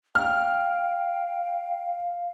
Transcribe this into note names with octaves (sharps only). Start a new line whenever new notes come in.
F5 G5 F6